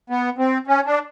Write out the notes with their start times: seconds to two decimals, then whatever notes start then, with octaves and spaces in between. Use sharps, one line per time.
0.10 B3
0.38 C4
0.67 C#4
0.86 D4